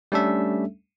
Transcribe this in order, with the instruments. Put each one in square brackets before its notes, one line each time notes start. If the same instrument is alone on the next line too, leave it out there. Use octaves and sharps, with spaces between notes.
[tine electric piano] G3 A3 C#4 D4 A4 E5